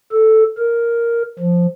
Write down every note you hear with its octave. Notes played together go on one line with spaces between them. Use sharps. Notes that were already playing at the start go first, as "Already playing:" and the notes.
A4
A#4
F3